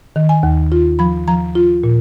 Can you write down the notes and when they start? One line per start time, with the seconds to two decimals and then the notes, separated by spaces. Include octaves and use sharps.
0.16 D#3
0.29 G#5
0.43 D#2
0.72 F4
0.99 F3 B5
1.28 F3 A#5
1.55 F4
1.84 A#2